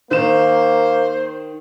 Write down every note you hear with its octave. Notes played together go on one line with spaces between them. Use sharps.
D#3 A#3 C5 E7